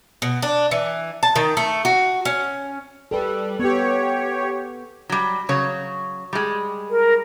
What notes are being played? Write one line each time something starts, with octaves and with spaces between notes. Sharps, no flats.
B2
D4
E3
A5
D#3
A3
F#4
C#4
G3 A4 B4
B3 G4 C#5
F#3 G3
C#3 F#3 C#5
G3 G#3
A#4